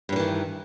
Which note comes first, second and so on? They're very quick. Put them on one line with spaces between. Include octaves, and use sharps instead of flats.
G2 F#3 E3 D#3